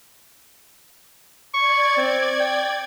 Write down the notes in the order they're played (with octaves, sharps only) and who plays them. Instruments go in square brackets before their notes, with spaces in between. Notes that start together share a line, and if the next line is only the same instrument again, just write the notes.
[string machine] D5 G#6 [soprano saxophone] C#6
[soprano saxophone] C4
G5